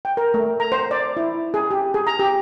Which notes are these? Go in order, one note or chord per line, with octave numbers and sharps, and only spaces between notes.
G5
A#4
A3
A#5
C5
D5
E4
G#4
G4
G#4
A#5
G4